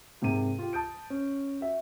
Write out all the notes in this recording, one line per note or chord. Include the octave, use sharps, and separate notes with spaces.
G#2 C3 A#3 A#4 D#7
F4 G4
A5 D#6 G6 D7
C#4
F#4 E5